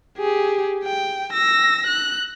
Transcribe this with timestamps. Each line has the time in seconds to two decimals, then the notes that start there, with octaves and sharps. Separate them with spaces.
0.18 G4 G#4
0.84 G5
1.33 E6 A#6
1.87 F#6